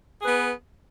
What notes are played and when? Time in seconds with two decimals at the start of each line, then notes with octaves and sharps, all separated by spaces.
0.20 G#4
0.24 B4
0.27 B3